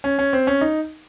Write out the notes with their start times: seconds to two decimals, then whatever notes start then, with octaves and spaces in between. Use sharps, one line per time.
0.04 C#4
0.19 C#4
0.33 C4
0.47 C#4
0.61 D#4